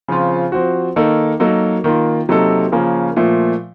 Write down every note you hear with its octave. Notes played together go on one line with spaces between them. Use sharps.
C#3 F3 C4 F4
F3 C4 F#4
D#3 A#3 D#4 A4
F#3 A#3 D#4 A4
D#3 A#3 F4
C3 F#3 A#3 D#4 A4
C#3 F3 A#3 C#4
A#2 F3 A3